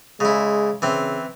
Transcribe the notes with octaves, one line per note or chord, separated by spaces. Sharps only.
C#3 G#3 E4
C#3 E3 C4